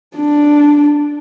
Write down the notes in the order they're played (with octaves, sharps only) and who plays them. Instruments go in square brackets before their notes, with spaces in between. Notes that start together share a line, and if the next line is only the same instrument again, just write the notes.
[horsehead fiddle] D4